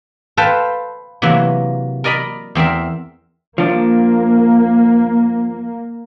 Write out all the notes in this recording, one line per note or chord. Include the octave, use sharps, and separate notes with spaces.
A4 B4 C5 F5 G5 A5
C3 E3 F#3 A#3
A#4 D5 D#5 A#5 B5
E2 C4 A#4 E5
F3 A#3 D4